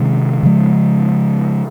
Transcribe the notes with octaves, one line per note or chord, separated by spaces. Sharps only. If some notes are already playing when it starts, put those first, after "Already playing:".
Already playing: C3 D#3 G#3 C#4
C#3 F3 G#3